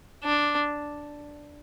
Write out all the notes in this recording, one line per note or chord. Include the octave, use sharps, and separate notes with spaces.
D4